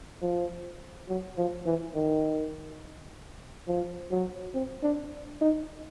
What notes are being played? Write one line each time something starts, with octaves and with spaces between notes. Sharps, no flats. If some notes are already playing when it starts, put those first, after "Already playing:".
F3
F#3
F3
E3
D#3
F3
F#3
C4
D4
D#4